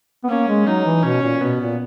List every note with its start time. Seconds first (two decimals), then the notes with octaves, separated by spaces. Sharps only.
0.24 B3
0.29 A#3 C#4
0.48 G#3
0.67 F#3 D#4
0.85 E3
1.03 B2 C#4
1.22 A#2
1.41 B2 B3
1.60 A#2